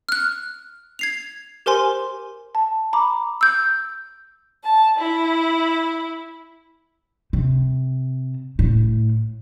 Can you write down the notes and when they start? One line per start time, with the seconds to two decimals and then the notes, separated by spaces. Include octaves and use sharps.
0.09 F6 F#6
0.99 G#6 C7 F7
1.66 G4 A#4 C5 G#5 C6
2.55 A5
2.93 A#5 B5 D6
3.41 E6 G6
4.66 A5
4.99 E4
7.33 C3
8.59 A2